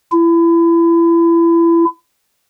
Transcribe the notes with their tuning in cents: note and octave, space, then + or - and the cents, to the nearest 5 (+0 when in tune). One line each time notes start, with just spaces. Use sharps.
E4 +30